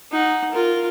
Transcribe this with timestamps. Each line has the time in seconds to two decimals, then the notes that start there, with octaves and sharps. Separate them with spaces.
0.12 D#4 F#5
0.52 F4 A#4